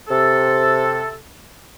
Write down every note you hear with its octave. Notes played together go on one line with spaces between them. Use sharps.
C3 A4